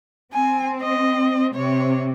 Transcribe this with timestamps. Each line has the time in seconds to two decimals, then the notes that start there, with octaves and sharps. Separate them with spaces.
0.33 C4 G#5
0.82 D#5
1.55 C3 C#5